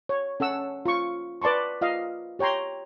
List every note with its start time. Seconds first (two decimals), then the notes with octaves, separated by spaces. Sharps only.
0.09 C#5
0.40 C#4 A4 F#5 E6
0.86 F4 C#6
1.42 B4 D5 A5 C6 C#6
1.81 F4 D#5 F5
2.39 G4 C#5 G5 A#5 C6